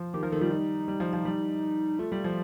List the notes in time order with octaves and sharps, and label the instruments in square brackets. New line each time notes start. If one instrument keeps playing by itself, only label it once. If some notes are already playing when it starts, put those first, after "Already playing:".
Already playing: [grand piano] F3
[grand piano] D#3 [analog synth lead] G4
[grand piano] F3 [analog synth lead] A#4
[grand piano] D#3 [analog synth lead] A4
[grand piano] G3 [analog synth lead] F4
[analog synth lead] D#4
[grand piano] G3
F3
F3
G3
[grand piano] A3 [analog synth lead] F4
[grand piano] G3
F3